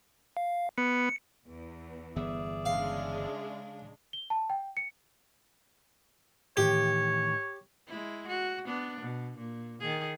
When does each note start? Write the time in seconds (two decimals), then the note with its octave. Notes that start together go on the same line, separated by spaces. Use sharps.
0.37 F5
0.78 B3 C#7
1.46 E2
2.16 G1 E3 B3 G#4 D5 E5
2.66 C#3 G#3 D4 F5
4.13 G7
4.30 A5
4.50 G5
4.77 C#7
6.57 A2 D#3 E3 G4 C#5
7.87 G#3 E4
8.28 F#4
8.65 B3 D4
9.01 B2
9.38 A#2
9.80 D#3 G#4